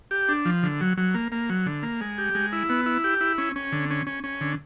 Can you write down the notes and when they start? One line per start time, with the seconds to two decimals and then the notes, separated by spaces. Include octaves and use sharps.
0.11 G4
0.29 D4
0.45 F3
0.63 D3
0.81 F#3
0.97 F#3
1.14 A#3
1.32 A#3
1.50 F#3
1.66 D3
1.83 A#3
2.01 G#3
2.18 G4
2.35 G#3
2.52 E4
2.69 B3
2.86 E4
3.04 G4
3.21 E4
3.38 C#4
3.56 C#4
3.72 D3
3.90 C#4
4.07 C#4
4.24 C#4
4.41 D3